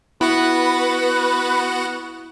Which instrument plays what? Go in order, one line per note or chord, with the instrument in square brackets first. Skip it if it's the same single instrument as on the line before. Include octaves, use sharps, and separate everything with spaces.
[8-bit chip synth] B3 F#4 F#5 [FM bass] E4 [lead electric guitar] B4